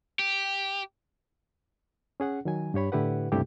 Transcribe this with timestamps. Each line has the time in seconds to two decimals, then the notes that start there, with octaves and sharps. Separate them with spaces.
0.19 G4
2.20 C#4 G#4 F#5
2.45 D#3 F#3 G#5
2.74 G2 G4 C#5 B5
2.92 A2 D3 E4 G4 B4 F#5
3.32 C#2 G2 C3 A3 E4 G4